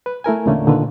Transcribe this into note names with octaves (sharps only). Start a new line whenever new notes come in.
B4
A3 E4 A#4 G#5
E2 A#2 D3 A3 A#3 C#4
A#2 D3 D#3 B4